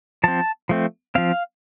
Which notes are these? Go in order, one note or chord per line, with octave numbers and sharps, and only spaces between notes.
F3 C4 A5
F3 A3 C4
F3 C4 F5